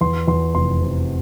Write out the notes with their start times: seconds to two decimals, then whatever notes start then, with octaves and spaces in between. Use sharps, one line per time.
0.01 E2 C6
0.27 E2 C6
0.55 F1 C6
0.81 C3